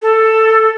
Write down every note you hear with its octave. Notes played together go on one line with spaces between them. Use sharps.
A4